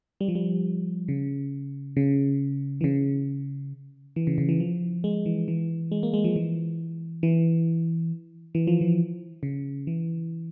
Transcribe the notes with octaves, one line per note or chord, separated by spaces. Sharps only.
G3
F3
G3
C#3
C#3
E3
C#3
E3
C#3
C#3
E3
F3
G#3
E3
E3
G#3
A#3
G#3
F3
E3
E3
E3
F3
E3
C#3
E3